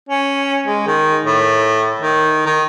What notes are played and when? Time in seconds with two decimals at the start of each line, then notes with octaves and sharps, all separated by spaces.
0.09 C#4
0.66 G#3
0.87 D#3
1.26 A2
2.01 D#3
2.46 D#3